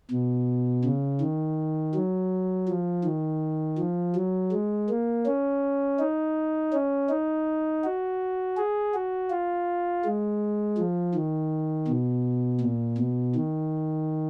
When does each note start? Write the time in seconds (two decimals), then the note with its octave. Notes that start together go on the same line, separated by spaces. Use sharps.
0.11 B2
0.85 C#3
1.21 D#3
1.95 F#3
2.69 F3
3.04 D#3
3.78 F3
4.16 F#3
4.52 G#3
4.89 A#3
5.26 C#4
5.99 D#4
6.73 C#4
7.09 D#4
7.84 F#4
8.57 G#4
8.94 F#4
9.30 F4
10.05 G#3
10.78 F3
11.15 D#3
11.88 B2
12.61 A#2
12.98 B2
13.35 D#3